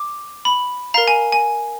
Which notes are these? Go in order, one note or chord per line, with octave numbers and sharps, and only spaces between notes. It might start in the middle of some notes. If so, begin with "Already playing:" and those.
Already playing: D6
B5
A#4 F5 A#5
G#5
G#5